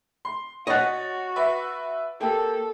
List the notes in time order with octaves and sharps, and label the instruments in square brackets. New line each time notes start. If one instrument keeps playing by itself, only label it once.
[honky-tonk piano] C6
[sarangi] F#4 [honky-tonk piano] C#5 A6 [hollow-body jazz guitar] D#5 F#5
[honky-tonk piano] B4 E5 D6
[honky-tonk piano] A#3 G4 [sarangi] A4